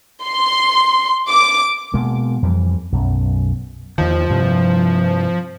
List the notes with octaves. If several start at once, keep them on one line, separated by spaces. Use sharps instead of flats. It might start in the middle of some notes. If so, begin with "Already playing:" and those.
C6
D6
B2 G#3 A#3
F2 E3 G3
B1 F#2
E2 D#3 F3
G2 C3